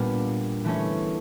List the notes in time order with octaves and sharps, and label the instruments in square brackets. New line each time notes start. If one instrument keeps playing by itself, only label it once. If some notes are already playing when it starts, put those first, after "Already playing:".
Already playing: [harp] A#2 G3 B3 D4
E3 A3 C#4